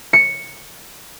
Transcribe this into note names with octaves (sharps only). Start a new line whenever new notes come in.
C#7